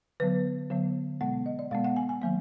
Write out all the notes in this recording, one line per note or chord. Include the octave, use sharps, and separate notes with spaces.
D3 F#3 B3 B4
D3 F#3 B3
B2 G#3 B3 F#5
D#5
D5
B2 G#3 B3 F5
F#5
G#5
G#5
D#3 F#3 A#3